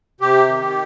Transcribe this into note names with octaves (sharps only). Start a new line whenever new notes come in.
C3 G4
D#3